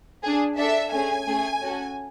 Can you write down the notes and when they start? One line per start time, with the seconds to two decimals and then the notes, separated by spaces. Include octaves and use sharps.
0.23 D4 G#4
0.58 D4 A4 E5
0.92 A3 C#4 G#4 G#5
1.26 A3 C#4 G#4
1.61 C#4 F#4 A4